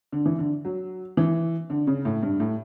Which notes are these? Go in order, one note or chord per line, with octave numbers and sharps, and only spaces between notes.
D3
E3
D3
F#3
E3
D3
C#3
A2
G2
A2